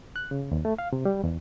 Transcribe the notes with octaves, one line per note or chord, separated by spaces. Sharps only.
F#6
C#3
D#2
A3
F5
C3
G3
E2